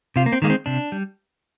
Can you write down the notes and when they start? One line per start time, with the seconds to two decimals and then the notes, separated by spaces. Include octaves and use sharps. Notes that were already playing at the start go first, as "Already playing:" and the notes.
0.16 C3 F4
0.26 A#3
0.32 C4
0.42 D#3 G#3 A#3
0.50 C4
0.66 C3 D4
0.92 G3